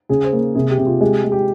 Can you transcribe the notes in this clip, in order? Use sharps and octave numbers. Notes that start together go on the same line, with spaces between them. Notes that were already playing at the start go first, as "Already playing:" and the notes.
C#3 G#4
C5
A#3
C3 G#4
G4
C3
F4
G#3 G4
G#3
G4